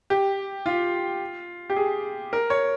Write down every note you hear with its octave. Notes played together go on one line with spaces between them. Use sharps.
G4
F4
G4
G#4
A#4
C#5